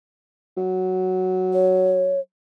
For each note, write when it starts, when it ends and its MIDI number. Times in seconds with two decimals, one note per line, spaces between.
0.57 2.18 54
1.53 2.20 73